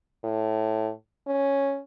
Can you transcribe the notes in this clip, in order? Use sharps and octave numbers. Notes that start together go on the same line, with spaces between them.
A2
C#4